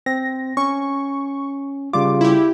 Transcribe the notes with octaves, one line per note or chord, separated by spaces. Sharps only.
C4 A#6
C#4 C#6
C#3 G3 F4 D6
E4 G4